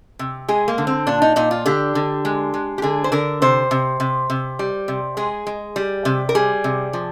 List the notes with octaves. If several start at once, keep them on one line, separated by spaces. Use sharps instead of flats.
C3
G#3 G#4
A#3
D3
C4
A#2 D4
D#4
A#2 D#4
F4
D3 G4
D3
G#3
G#3
G4
D3 G#4
C5
D3 A#4
C3 C5
C3
C3
C3
G3
C3
G#3 G#4
G#3
G3
C3
A#4
G3 G#4
C3
F3